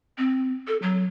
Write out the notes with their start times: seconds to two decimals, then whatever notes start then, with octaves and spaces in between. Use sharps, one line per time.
0.18 C4
0.67 A4
0.82 F#3